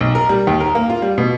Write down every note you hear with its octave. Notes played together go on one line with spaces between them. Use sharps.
B1
A#4
G3
D#2
A#4
A#3
F4
G3
B2